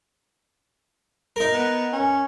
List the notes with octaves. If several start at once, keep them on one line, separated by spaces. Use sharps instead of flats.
D#4 A#4
B3
C#4